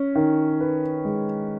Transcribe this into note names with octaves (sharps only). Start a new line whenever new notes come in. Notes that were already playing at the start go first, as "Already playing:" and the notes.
Already playing: C#4
D#3
B4
G#3